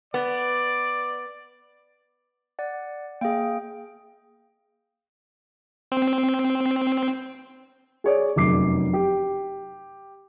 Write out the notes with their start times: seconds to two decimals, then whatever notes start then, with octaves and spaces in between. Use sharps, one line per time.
0.14 B3 D5
2.59 D5 F#5
3.21 A#3 G#4 F5 G5
5.92 C4
8.04 G#4 C#5 D5
8.36 F1 F#2 D6 C7
8.93 G4